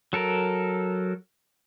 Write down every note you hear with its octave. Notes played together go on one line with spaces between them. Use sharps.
F#3 A4 A#4